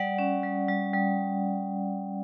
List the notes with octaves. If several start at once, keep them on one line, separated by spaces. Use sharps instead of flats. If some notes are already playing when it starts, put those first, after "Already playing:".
Already playing: G3 D5 F#5
C#4
G3
G3
G3